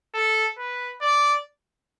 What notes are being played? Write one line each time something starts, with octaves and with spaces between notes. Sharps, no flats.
A4
B4
D5